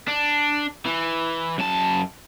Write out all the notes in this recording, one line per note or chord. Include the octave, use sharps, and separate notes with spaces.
D4
E3
F#2 A5